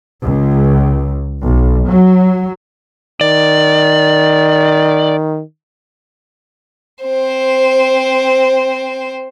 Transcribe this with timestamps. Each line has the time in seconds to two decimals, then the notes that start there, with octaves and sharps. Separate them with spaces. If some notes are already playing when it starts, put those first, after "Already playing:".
0.22 C#2
1.43 B1
1.88 F#3
3.21 D#3 D5
7.03 C4 C5